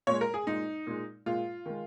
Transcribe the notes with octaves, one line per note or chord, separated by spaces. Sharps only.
A#2 G#3 C#5
A#4
G#4
A#2 G#3 D#4
A#2 G#3
A#2 G#3 F4
D#3 G#3